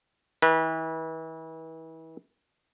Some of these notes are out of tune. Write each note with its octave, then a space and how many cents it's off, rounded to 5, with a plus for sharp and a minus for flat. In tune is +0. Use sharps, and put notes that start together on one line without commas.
E3 -35 B4 -25